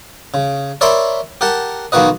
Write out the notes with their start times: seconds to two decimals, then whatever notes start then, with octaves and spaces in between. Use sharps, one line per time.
0.34 C#3
0.81 A#4 C#5 D5 E5 B5 C6
1.41 G4 A#4 F#5 A5
1.92 B1 D#3 A#3 F#4 B4 D#5